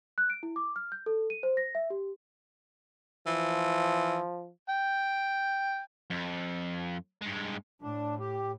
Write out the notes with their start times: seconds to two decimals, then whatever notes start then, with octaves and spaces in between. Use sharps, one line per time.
0.18 F#6
0.30 D7
0.43 E4
0.56 D6
0.76 F6
0.92 G6
1.06 A4
1.30 D#7
1.43 C5
1.57 A#6
1.75 E5
1.90 G4
3.26 E3 F3
4.70 G5
6.10 F2
7.22 G2 G#3
7.82 A2 D4
8.19 G4